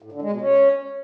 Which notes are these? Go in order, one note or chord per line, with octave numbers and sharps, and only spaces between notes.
A2
D3
G#3
B2
C#4